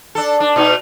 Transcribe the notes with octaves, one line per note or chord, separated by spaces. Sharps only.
D4 A4
D4
B2 D#4 F#4